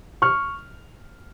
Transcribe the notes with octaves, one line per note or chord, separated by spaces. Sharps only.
C#6 F6